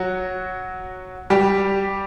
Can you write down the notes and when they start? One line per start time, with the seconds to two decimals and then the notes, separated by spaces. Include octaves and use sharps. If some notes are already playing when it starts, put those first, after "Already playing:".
Already playing: F#3 F#4
1.30 G3 G4